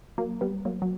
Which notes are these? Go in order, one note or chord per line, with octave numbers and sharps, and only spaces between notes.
F#3 A#3
G3 B3
F#3 A#3
F#3